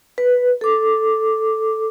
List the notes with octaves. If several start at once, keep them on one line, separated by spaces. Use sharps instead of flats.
B4
A4 D6